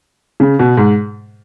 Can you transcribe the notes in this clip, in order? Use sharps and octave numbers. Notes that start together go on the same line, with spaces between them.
C#3
B2
G#2